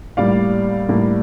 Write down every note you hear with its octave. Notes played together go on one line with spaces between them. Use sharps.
A2 G3 A#3 D5 F5
A2 G3 A#3